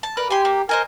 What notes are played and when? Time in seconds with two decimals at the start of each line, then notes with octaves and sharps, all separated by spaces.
0.03 A5
0.17 A#4 B4 D5
0.30 G4 G#5 C6
0.45 A#3
0.69 A#4 C5 D#5 G#5